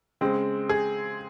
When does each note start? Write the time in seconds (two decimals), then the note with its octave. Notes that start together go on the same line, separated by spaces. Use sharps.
0.21 C#3 G#3 C4
0.69 G#4